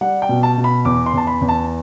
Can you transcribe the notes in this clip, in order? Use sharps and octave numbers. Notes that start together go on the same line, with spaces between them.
G3 F#5
G5
B2
A5
B2
B5
E2 D6
C6
E2 A5
B5
E2
A5